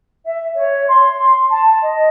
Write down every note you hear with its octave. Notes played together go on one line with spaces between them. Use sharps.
E5
C#5
C6
A5
D#5